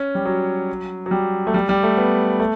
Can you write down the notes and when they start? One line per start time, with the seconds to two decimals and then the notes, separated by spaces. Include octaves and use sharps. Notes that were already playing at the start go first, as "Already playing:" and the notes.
Already playing: C#4
0.15 G3
0.25 F#3
1.06 F#3
1.11 G3
1.47 A3
1.54 G3
1.69 G3
1.83 A3
1.97 B3
2.39 A3